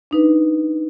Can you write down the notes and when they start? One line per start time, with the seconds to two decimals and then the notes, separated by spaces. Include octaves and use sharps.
0.11 D4 D#4 B4